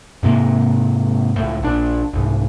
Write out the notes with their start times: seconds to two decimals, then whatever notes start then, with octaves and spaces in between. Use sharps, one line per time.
0.23 G#2 C3 A#3
1.36 C#2 A2
1.63 A#1 D4
2.13 C2 G#2